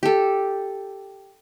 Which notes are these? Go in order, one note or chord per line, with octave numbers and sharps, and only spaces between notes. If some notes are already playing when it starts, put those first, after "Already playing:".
G4 A4